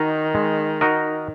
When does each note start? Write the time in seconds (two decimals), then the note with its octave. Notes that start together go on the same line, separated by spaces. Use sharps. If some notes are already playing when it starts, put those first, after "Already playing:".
Already playing: D#3 D#4 F#4 A#4 D#5
0.34 G#3
0.81 D#4 F#4 A#4 D#5